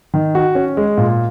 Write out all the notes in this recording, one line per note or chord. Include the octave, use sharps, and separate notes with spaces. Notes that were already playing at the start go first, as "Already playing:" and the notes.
D#3
F#4
C#4
G#3
A#2